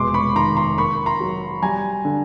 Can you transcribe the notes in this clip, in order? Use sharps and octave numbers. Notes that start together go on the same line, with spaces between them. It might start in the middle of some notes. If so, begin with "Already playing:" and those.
Already playing: F1 B2 G#3 C6 D6
B5 C#6
D#3 A#5 C6
A#5 C6
A#3 B5 C#6
A#5 C6
F#3
G3 G#5 A#5
D3